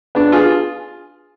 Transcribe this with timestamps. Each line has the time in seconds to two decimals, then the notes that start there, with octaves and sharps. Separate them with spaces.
0.15 B3 D4
0.32 F4 G#4